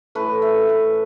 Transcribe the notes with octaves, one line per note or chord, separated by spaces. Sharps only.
A2 E3 A3 B4
E5
B4